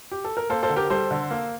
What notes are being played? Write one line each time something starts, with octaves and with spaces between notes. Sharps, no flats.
G4
A4
A#4
A#3 A4 C5
A4 C5
D3
G4 A#4
G3 A4 C5
D3
A#3